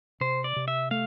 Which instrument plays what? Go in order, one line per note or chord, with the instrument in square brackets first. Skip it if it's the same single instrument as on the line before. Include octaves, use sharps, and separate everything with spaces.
[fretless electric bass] C3 [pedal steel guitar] C5
[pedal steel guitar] D5
[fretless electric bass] C3
[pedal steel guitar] E5
[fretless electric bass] A3 [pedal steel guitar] F5